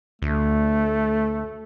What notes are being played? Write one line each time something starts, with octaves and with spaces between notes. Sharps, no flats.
D2 A3